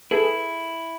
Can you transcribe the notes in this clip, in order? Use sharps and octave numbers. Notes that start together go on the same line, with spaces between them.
E4 G#4 A4 B4